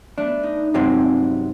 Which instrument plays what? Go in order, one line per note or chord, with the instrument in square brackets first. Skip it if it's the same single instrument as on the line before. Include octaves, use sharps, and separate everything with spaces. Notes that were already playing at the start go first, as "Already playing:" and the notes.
[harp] A3 B3 [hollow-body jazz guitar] D4
[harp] D#4
[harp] G2 G#3 [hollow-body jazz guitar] C3 F#3 C4